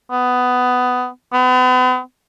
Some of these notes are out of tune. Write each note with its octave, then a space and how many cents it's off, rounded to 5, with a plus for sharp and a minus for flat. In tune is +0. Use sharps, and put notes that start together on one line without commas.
B3 +15
B3 +40